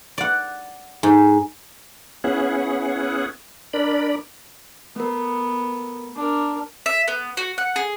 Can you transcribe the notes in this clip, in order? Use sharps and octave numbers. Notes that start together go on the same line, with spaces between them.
D5 F#5
G#2
B3 C#4 E4 G#4 F#5
D4 A#4 D5 B5
A3 B3 A#4
D4 A#4
E5
B3
F#4
F#5
G#4